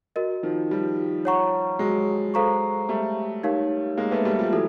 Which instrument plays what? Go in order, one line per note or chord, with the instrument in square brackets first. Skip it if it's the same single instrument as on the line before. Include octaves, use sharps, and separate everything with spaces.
[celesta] F#4 A#4 D#5
[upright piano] D#3 F3
F3 G3
[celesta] C#5 F#5 A#5 C#6
[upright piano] F#3 G#3
[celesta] A4 C5 F5 A#5 C#6
[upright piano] G3 A3
[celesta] D#4 G4 A#4 C#5 F5
[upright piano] G#3 A#3
A3 B3
G3 A3
F3 G3
[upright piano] E3 F#3 [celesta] A4